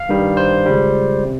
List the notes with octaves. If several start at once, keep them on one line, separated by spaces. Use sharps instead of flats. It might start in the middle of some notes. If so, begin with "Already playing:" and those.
Already playing: F5
G2 D#3 G3
C5
C#2 C#3 G3
C3